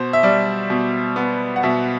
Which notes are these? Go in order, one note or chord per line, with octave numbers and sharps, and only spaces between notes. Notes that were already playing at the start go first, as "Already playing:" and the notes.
Already playing: B2 C5
E5
G3 D5
B2
B3
F#5
B2 E5